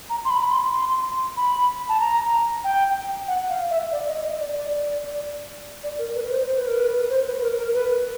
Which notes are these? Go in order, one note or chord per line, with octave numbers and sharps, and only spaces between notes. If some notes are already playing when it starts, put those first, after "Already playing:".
A#5
C6
B5
B5
C6
C6
B5
A5
A#5
G5
F#5
F5
E5
D5
D#5
D#5
D5
D5
D5
A#4
B4
C5
C5
B4
A#4
B4
C5
B4
A#4
A#4
B4